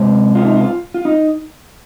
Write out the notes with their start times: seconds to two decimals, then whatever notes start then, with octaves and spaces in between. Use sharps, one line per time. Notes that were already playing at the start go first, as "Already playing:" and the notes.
Already playing: C3 G#3
0.35 F4
0.45 D#4
0.56 F4
0.94 F4
1.05 D#4